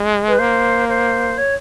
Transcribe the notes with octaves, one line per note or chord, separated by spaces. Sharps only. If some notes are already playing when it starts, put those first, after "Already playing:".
Already playing: G#3
B4
A#3 C5
C5
C#5